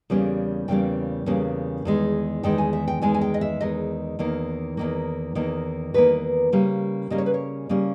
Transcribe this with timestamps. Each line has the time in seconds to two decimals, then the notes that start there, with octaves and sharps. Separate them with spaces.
0.10 E2 C#3 G3 A#3 C#4
0.68 E2 C#3 G3 A#3 C#4 G5
1.26 E2 C#3 G3 A#3 C#4
1.85 E2 D#3 G#3
2.43 E2 D#3 G#3 G5
2.58 G#5
2.73 E5
2.88 G5
3.02 E2 D#3 G#3 G#5
3.14 G#5
3.21 G5
3.34 D#5
3.41 E5
3.61 E2 D#3 G#3 D#5
4.19 E2 D#3 A#3
4.77 E2 D#3 A#3
5.35 E2 D#3 A#3
5.94 E2 D#3 A#3 B4
6.52 C#3 G3 A#3 C#4
7.10 C#3 G3 A#3 C#4 D#5
7.18 C#5
7.26 B4
7.34 C#5
7.69 C#3 G3 A#3 C#4